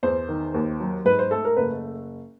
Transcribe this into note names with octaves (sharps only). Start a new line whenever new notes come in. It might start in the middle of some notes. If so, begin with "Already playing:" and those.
E2 C5
D#3
D#2
F#3
G#2 B4
C5
A3 A4
A#4
F#1 B4